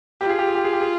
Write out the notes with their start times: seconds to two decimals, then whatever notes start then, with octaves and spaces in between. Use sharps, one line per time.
0.21 F4 G4
0.29 G#4
0.39 G4
0.47 G#4
0.55 G4
0.64 G#4
0.73 G4
0.81 G#4